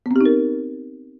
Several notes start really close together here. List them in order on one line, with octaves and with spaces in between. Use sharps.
B3 C4 G4 D#4 A#4